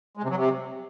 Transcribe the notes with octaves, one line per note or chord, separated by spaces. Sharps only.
G#3
C3
F#3
C3